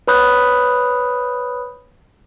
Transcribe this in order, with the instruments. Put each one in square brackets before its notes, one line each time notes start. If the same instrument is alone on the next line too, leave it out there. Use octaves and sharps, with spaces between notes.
[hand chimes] B4 C#5 B5 D#6 F#6 G6